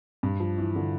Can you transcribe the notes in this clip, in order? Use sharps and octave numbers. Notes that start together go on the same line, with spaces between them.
G2
F3
E3
D3